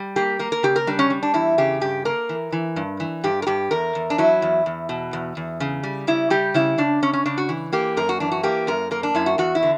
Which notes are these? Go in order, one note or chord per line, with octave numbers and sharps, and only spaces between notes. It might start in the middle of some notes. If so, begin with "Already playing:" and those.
Already playing: G3
A#3 G4
A#3 A#4
A#4
C#3 G4
A#4
G3 D4
C#4
G3
D4
E2 E4
C#3 G4
G2 G4
A#3 A#4
E3
E3
G2
E3
G2 G4
A#4
G2 G4
E2 A#4
E2
D4
F#3 E4
E2
E2
B2
E2
E2
C#3
G3
C#3 E4
G3 G4
C#3 E4
C#3 D4
C#3 C#4
C#4
C#3 D4
F#4
E3
A#3 G4
F#2 A#4
F#4
E3 D4
F#4
A#3 G4
F#2 A#4
A#3 A#4
D4
F#2 E4
F#4
E2 F#4
E4
D3